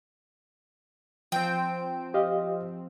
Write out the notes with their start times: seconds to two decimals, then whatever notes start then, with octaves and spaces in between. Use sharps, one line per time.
1.32 F3 C4 G5
2.14 G4 D#5 F5